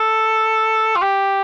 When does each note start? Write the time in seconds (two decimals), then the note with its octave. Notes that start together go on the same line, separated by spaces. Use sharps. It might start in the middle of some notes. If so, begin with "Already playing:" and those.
Already playing: A4
0.96 F4
1.02 G4